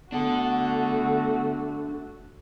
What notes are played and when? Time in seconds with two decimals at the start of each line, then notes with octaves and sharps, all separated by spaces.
0.12 A3 B3 D4 F#4 A4